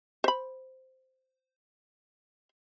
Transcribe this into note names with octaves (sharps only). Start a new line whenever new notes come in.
C5 B5